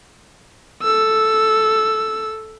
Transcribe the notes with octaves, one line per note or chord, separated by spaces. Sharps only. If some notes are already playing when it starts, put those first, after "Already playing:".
A4 E6